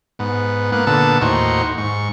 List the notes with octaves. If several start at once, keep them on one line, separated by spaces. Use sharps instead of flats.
G#2 B3
A#3 B3 F#5
A#2 D3 B3 A4 A5
D#2 A2 D#4 F#4 C5 C#6
G#2 C#6